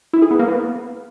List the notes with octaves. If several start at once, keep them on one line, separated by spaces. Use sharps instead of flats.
E4
G#4
B3
A#3
B3